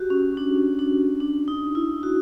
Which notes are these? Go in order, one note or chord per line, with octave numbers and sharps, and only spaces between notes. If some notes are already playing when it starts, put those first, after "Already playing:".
Already playing: F#4 G4
C#4
D4
D4
D4
D#4
E4
F#4